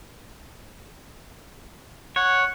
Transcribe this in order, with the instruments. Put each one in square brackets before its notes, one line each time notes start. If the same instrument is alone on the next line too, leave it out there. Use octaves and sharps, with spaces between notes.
[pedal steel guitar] C#5 [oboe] F#5